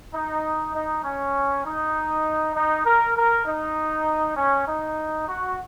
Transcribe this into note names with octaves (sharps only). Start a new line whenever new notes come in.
D#4
D#4
C#4
D#4
D#4
A#4
A#4
D#4
C#4
D#4
F#4